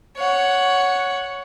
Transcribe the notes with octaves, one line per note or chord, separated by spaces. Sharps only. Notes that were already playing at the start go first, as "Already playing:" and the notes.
C#5 F#5